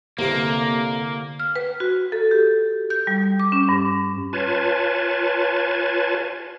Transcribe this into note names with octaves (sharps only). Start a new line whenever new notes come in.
C2 G2 D3 A#3
F6
B4
F#4
A4
G4
G6
G3
D6
C#4
G2
F4 B4 C#5 G#5 A5